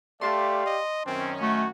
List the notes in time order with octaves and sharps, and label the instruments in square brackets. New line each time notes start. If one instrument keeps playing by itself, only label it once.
[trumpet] A3 [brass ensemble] G4 D5 F5 [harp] A5 C6
[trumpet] D#5
[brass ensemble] F#2 D#3 C#4 [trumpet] C4
[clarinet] A3 [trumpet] F#4